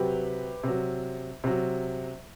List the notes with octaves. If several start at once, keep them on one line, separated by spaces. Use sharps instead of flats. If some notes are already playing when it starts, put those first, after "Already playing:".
Already playing: C3 F#3 G4 B4
C3 F#3
C3 F#3